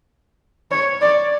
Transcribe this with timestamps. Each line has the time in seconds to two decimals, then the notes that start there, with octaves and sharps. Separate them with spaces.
0.71 C#5
1.01 D5